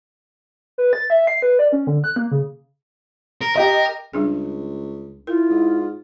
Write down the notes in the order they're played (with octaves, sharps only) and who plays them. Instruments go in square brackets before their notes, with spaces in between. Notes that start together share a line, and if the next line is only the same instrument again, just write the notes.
[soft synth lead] B4
A6
E5
C7
B4
D5
C#4
D3
F#6
A#3
C#3
[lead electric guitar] A#4
[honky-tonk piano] G4 D#5 [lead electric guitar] A#4
[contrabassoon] C#2 [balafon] G3 D4 G#4
[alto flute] E4 [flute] F4 [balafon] A#4
[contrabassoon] G#2